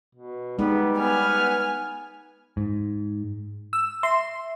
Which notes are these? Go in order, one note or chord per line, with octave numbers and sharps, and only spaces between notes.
B2
G3 G#3 B3 D#4
B3 G#5 F6
G#2
E6
E5 C6